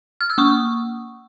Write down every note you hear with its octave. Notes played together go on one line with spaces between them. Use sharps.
F6
E6
A#3 C#6 D#6